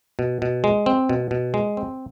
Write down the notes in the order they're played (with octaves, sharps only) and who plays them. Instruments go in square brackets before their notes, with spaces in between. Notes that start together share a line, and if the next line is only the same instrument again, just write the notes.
[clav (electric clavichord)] B2
B2
G#3
C4
B2
B2
G#3
C4